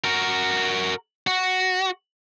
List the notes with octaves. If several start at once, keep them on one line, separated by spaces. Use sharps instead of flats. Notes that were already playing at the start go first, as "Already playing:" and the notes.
F#4 A#4
F#4